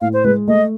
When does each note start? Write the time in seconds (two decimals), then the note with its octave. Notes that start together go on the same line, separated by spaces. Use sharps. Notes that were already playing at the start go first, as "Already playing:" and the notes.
0.01 A2 F5
0.13 C5
0.24 G#3 B4
0.48 A3 D#5